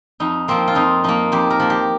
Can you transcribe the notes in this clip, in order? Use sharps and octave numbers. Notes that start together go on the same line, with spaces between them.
F2 D#4
F3 A#3 C4
F4
F2 D#4
F3 A#3 D#4
F2 G4
A#4
F3 A#3
G4